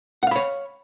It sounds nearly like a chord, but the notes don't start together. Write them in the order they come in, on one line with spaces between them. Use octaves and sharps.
F#5 F5 B5 C#5